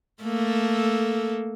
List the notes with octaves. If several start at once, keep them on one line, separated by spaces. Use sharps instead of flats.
A3 A#3 A4